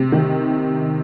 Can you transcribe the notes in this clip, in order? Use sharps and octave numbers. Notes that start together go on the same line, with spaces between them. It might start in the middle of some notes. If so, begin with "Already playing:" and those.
Already playing: C3
D#3